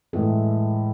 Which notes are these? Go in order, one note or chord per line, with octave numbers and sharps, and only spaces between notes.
A2 E3 G#3 A3